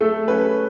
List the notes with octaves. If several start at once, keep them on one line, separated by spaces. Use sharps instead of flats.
A3 A4
C#4 B4